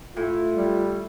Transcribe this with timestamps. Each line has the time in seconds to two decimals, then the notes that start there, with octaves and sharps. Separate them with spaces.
0.17 A2 F4
0.55 G3